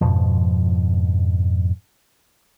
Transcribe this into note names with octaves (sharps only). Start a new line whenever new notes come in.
F2 G#2 B2 F3